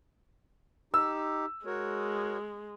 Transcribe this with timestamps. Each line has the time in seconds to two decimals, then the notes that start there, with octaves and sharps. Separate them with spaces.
0.94 D#4 G4 E6
1.66 G#3 F#4 A#4 C#5